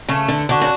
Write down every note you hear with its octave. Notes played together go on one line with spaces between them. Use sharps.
C#3 A3
D3
D3 D4 F#4
C#3